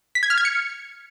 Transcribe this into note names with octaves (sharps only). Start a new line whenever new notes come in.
B6
G#6
F6
G#6
C#7